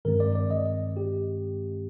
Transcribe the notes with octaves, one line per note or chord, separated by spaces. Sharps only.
G2 D#3 G#3 C4 A#4
D5
D5
D#5
G4